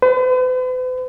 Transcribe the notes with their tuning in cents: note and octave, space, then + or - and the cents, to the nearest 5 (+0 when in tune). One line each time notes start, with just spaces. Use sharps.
B4 +45